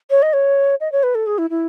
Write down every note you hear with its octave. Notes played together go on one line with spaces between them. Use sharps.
C#5
D#5
C#5
D#5
C#5
B4
A4
G#4
E4
E4